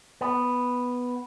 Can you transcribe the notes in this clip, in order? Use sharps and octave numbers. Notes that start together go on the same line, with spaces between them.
B3